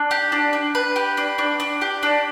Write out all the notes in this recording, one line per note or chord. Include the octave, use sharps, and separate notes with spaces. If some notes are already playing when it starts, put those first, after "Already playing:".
Already playing: D4
G4
D4
D4
B4
G4
D4
D4
D4
G4
D4